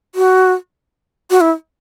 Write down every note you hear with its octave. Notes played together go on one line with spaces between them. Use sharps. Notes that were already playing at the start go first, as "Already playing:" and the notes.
F#4
F#4
E4